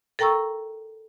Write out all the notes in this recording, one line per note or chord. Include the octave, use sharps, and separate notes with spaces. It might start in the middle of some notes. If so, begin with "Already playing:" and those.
A4 A#4 G5 A#5 C#6 E6